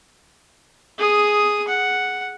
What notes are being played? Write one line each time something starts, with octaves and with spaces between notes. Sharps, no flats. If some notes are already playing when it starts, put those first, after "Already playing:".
G#4 D#6
F#5